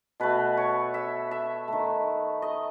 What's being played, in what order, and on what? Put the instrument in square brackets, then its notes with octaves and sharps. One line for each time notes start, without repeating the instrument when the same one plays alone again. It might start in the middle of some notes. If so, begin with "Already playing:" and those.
[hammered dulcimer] B2 A3 B4
C#5
E5
E5
D#3 A3
D#5